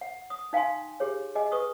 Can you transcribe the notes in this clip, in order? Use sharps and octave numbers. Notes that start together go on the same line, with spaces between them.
F#5
D#6
D#4 F5 G5 G#5 C6
G4 G#4 C#5
G#4 D#5 G#5
B4 C#6 D#6